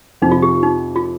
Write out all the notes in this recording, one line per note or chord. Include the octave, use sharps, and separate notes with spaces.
F2 C3 F3 D#4
F4
G4
D#4
F4